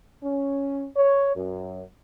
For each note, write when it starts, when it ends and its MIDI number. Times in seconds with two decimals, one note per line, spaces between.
0.23 0.86 61
0.96 1.35 73
1.35 1.82 42